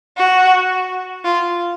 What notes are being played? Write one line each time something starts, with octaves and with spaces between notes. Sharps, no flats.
F#4
F4